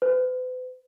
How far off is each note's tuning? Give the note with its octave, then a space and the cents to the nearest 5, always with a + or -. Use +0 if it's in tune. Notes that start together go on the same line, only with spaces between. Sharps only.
B4 +45